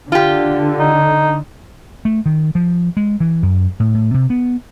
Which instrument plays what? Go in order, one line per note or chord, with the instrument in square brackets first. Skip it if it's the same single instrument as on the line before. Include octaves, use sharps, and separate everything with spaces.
[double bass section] D3 [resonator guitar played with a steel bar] F4 G4
[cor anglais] D#4
[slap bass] A3
D#3
F3
G#3
E3
F#2
A2
A2
C3
B3